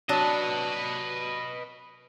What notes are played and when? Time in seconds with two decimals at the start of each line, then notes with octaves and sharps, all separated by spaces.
0.09 F#3 D4 B4 D#5 A5